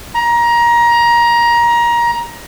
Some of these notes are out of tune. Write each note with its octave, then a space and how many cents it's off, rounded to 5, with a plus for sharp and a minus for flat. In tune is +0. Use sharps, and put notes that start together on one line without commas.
A#5 +20